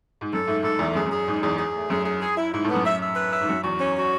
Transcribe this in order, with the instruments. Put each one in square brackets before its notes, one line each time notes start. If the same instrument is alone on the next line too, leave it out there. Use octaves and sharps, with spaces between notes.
[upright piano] G#2
[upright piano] F#2 [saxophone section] A4
[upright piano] G#2 [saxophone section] A3
[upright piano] G#2 [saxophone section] A4
[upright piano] E2 [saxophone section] A3
[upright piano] F#2 [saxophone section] G#4
[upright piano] F#2
[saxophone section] G#4
[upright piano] G#2 [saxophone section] D#4
[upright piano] E2 [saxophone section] G#4
[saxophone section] G#4
A3
[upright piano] F#2 [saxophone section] G#4
[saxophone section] G#4
G#4
E4
[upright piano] G#2 [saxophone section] E4
[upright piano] A2
[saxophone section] B3
[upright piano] F#2
[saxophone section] E5
E5
B4
E5
[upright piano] G#2
[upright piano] F#2 [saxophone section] F#4
[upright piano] E2 [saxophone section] F#4
[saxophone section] C#4
F#4